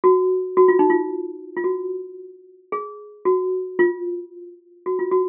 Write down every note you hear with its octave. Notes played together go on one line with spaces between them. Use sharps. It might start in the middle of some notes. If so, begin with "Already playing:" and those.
F#4
F#4
F4
D#4
F4
F4
F#4
G#4
F#4
F4
F#4
F4
F#4